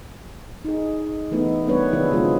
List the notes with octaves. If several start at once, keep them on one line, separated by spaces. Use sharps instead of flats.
D#4 G#4
E3 A3 B3 D#4 E4
G3 A#3 B3 D4 B4 C#5
D3 F3 B3 E4 G#4
C3 F#3 G#3 B3 F4 G#4